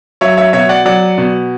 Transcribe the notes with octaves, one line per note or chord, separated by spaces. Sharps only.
F#3 C#5 E5
C#5 E5
B2 C#5 E5
D5 F#5
F#3 D5 F#5
B2